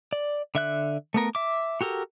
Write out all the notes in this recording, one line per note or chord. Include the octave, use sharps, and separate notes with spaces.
D5
D3 E5 F#6
A3 B3 A#4
E5 D6
F#4 G4 A4 A#4